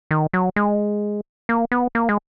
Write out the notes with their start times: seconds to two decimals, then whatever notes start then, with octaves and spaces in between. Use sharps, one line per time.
0.11 D#3
0.33 F#3
0.56 G#3
1.49 A#3
1.72 B3
1.95 A#3
2.09 G#3